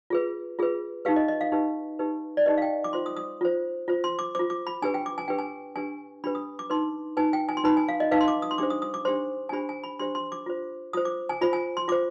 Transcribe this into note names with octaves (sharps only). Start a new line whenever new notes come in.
F4 G#4 B4
F4 G#4 B4
D#4 G4 B4 F5
D#5
D#5
F5
D#4 G4 B4
D#4 G4 B4
D5
D#4 G4 B4 D#5
F5
G5
D6
F4 C5 C6
D#6
D#6
F4 C5
F4 C5
C6
D6
F4 C5 D6
D6
B5
D4 G4 B4 G#5
G5
D6
G#5
D4 G4 B4 G5
G#5
D4 G4 B4 G#5
D4 G4 B4 B5
D#6
D6
D#4 B4 C6
D#4 B4 G#5
G5
G#5
C6
D#4 B4 B5
G#5
F5
D#5
D#4 B4 F5
C6
D6
D#6
C6
D4 G4 C5 D6
D#6
D#6
D6
D4 G4 C5 C6
G#5
D4 G4 C5 B5
G#5
B5
D4 G4 C5 C6
C6
D6
F4 C5
F4 C5 D#6
D6
G#5
F4 C5 B5
G#5
C6
F4 C5 D6